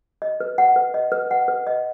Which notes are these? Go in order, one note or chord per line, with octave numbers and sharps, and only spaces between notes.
D#5
B4
F#5
B4
D#5
B4
F#5
B4
D#5